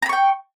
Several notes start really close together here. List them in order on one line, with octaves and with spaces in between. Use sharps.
A#5 B5 C#6 G5